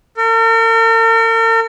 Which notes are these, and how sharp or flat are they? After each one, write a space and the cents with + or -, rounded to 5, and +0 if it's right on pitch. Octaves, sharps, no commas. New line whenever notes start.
A#4 -45